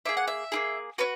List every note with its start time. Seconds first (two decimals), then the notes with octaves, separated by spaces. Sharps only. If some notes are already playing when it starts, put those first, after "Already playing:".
0.05 A#3 E4 G#4 E5
0.17 F#5
0.28 E5
0.52 A#3 E4 G#4
0.98 C#4 F#4 B4